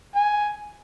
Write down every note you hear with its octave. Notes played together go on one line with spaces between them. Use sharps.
G#5